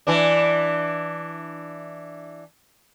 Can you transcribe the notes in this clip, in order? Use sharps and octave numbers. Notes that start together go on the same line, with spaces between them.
E3 D4